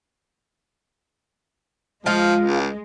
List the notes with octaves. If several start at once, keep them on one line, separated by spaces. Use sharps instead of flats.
F3 G#3 F4 D#5 F5
C#2